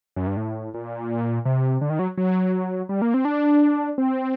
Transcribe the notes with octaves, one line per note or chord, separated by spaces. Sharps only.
F#2
G2
A2
A#2
C3
D3
D#3
F#3
F#3
G3
A#3
C4
D4
C4